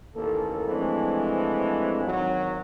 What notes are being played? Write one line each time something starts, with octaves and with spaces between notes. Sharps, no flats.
A1 D#2 A#3 A4
E3 F3 G#3 A3 C4 D4
G#1 F#3